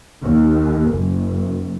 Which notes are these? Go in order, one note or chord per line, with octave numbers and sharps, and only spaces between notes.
D#2
F#1